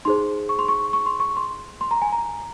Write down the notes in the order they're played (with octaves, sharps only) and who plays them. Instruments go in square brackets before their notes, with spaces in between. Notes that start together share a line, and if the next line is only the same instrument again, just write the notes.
[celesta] D#4 G#4 C5 C6
C#6
C6
C#6
C#6
C6
C#6
C6
C6
A#5
G#5
A#5